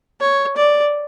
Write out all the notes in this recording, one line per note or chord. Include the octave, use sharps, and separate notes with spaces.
C#5
D5